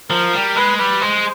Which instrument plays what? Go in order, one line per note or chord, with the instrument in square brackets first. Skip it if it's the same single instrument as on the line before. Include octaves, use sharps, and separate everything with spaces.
[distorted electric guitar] F3 [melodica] A#4
[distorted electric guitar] G3
[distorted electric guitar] G#3 [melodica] B4
[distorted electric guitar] G3 [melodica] B4
[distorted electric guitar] G#3 [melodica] C5